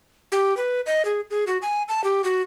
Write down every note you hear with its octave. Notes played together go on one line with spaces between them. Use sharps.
G4
B4
D#5
G#4
G#4
F#4
G#5
A5
G4
F#4